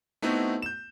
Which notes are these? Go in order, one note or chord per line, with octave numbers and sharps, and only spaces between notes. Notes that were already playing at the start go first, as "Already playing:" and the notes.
A3 B3 C4 D#4 E4 F#4
G6 E7